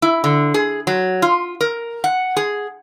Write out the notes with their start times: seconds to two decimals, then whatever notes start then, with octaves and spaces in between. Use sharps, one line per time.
0.02 E4
0.24 D3
0.54 G#4
0.87 F#3
1.22 F4
1.61 A#4
2.04 F#5
2.37 G#4